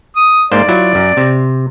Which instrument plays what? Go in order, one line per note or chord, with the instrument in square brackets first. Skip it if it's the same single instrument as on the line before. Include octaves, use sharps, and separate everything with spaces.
[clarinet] D#6
[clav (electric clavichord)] G#2 A#3 C5 [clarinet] D5
[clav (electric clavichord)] F#3 E4 F4
F#2
C3